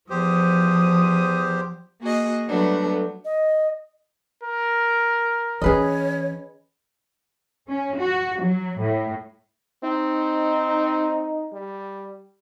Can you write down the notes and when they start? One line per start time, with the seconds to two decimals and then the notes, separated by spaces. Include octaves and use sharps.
0.10 E2 F3 G4 C5 D#6
2.01 A#3 F#4 G#4 D#5
2.48 F#3 G3 A3 B3 D4
3.25 D#5
4.43 A#4
5.62 E3 C#4 G#4 B4 C#5 D#5
7.69 C#4
7.99 F#4
8.42 F#3
8.79 A2
9.83 C4 D#4
11.53 G3